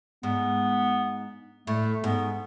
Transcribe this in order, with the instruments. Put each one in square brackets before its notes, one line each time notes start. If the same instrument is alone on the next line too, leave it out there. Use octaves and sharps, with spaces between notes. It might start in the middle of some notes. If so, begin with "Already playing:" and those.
[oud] G#2 [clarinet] B3
[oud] A2 [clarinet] A3
[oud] G#2 [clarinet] B3